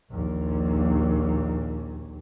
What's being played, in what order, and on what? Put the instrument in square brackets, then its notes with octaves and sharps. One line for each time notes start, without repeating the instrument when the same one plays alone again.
[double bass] A#1 D#2